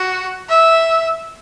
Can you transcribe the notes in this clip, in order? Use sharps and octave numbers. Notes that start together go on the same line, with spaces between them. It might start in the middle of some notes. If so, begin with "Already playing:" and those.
Already playing: F#4
E5